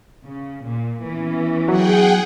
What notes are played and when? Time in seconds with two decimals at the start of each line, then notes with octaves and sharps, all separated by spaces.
0.25 C#3
0.65 A#2
1.05 E3 B3 C#4
1.68 F#3 G#4 F#5 G5